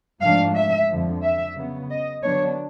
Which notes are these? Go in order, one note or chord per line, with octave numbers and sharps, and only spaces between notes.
G#2 F3 A3 D4 F5
E5
F2 D3 F3
E5
C#3 F#3 B3
D#5
D3 F#3 B3 D4 C#5